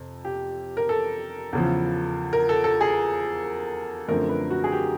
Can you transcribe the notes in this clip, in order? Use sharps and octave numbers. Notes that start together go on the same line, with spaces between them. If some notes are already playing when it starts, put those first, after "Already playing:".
Already playing: F2 C3
G4
A#4
A4
E2 C#3 F3
A#4
A4
A4
G#4
F#2 D3 F3 A3 C4 A#4
B4
F#4
G#4
G4